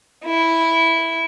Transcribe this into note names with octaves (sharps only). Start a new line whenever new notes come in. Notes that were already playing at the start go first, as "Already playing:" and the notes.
E4